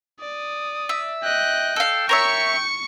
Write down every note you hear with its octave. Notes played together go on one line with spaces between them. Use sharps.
D5 D#6
E5
D#5 G5 F#6
A4 F5 G5
A#4 C#5 E5 C#6 C#7